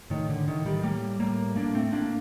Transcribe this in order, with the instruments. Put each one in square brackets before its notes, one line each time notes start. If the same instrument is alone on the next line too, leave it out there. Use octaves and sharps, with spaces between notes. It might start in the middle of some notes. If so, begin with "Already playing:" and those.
[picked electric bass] A2 D#3
D3
A2 D#3
D#3 G3
A2 G3 A#3
A2 G3 A#3
A2 A#3 D4
A3 C4
A2 A#3 D4